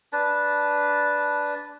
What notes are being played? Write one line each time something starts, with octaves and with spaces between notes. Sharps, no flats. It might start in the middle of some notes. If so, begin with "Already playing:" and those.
D4 B4 A5